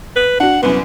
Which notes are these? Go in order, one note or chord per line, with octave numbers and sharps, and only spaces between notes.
B4
D4 F#4 F#5
C2 F#2 B3